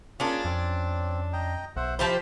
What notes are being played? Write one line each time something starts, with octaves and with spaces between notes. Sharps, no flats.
A#3 C#4 D4 F4 G#4 D5
F2 C4
D#5 G5 A#5
B1 C5 E5 F#5
F3 D#4 E4 G4 C5